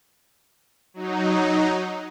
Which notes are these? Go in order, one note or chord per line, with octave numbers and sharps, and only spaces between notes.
F#3 D#4